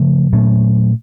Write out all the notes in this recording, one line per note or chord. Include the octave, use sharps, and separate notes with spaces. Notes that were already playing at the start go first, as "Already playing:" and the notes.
Already playing: C#3 F3 A3 C#4
A#2 F#3 A3 C#4